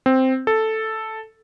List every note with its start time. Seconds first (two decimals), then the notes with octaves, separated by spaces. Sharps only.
0.06 C4
0.47 A4